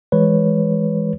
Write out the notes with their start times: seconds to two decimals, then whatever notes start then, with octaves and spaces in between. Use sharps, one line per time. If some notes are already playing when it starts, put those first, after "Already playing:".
0.12 E3 G#3 B4 C#5